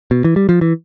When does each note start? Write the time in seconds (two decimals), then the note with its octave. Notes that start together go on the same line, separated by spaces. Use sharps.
0.11 B2
0.24 E3
0.36 G3
0.49 F3
0.61 E3